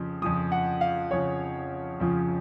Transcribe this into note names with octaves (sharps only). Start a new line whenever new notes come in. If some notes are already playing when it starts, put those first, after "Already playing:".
Already playing: F2 C#3 F3
F2 C#3 F3 D#6
F#5
F5
F2 C#3 F3 C#5
F2 C#3 F3